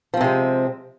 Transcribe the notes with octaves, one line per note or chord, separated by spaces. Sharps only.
C3 F3 G#3 C4